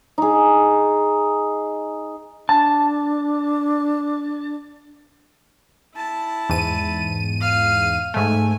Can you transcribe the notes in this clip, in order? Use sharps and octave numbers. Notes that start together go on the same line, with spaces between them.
D#4 G#4
D4 A5
E4 A5
E2 G#2 D#7
F5
G#2 A3 G#5